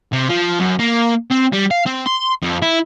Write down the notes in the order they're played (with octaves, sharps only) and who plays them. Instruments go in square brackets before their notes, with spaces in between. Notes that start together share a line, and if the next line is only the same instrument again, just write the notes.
[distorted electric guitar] C3
F3
F#2
A#3
C4
G3
F5
C4
C6
F2
E4